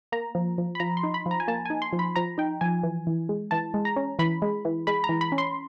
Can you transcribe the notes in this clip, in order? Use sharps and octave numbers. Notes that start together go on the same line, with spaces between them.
A#3 A#5
F3
F3
B5
F3 A#5
C6
D#4
B5
F3
A#5
G#5
A#3 A5
D#4 G#5
C6
F3
B5
F3 A#5
D#4 G5
F3 G#5
E3
E3
G#3
E3 A5
G#3
A#5
C#4
E3 B5
G#3
E3
G#3 B5
A#5
E3
B5
C#4
C6